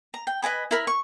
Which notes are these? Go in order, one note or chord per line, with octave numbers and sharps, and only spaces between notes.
A#5
G5
B4 D#5 G#5 B5
E4 A#4 B5
C#6